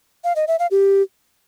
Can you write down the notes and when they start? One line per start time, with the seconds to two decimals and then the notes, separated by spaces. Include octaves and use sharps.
0.24 F5
0.36 D#5
0.48 E5
0.59 F5
0.71 G4